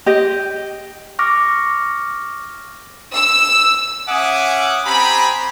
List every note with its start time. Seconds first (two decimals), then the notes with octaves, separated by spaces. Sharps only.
0.06 G4 D#5
1.19 C#6 D6 F6 A#6
3.13 E6
4.09 C#4 E5 F#5 G#5 D6 D#6
4.85 C4 G4 G#5 A#5 B5